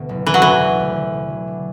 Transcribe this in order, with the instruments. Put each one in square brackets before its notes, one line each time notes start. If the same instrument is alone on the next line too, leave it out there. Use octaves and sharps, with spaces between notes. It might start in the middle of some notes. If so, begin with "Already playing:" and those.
Already playing: [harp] D2 B2 B3
F#1
[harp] E2 [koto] E3
[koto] F#3
[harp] D3 [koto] E3
[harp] E1
D2
D3
E1
F#3
D4